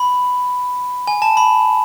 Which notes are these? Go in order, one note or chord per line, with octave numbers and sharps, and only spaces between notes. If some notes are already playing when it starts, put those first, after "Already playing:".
Already playing: B5
G#5
A5
B5